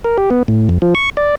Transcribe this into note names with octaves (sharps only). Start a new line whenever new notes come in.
A#4
G4
B3
A2
F2
F3
C#6
D5